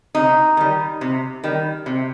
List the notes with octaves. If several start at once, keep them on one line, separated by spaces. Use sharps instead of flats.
C3 D#4
D#3 G3
C3
D#3 G3
C3